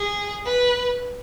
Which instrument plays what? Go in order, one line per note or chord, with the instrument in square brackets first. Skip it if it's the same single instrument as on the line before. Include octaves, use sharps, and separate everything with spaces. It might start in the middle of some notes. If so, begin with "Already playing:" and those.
Already playing: [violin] G#4
B4